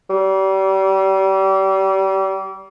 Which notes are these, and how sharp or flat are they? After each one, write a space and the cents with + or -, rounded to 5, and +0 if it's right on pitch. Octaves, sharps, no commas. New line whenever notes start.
G3 -35